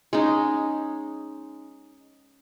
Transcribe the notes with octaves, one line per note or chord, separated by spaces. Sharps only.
G#3 C#4 D#4